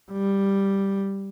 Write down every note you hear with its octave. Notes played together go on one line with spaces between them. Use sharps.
G3